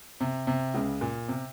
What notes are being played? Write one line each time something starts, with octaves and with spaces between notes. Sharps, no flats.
C3
C3
C#2 C#3
A#2
C3